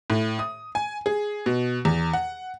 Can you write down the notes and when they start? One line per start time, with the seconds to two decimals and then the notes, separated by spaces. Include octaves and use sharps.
0.10 A2
0.39 D#6
0.75 G#5
1.06 G#4
1.46 B2
1.85 E2
2.13 F#5